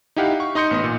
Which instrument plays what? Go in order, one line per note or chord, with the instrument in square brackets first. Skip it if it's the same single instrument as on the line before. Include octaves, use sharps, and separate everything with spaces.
[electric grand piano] D#4 E4 G4 F5 F#5
C#6
D#4 D#5 C6 G6 C#7
A1 B3 D#5
A#2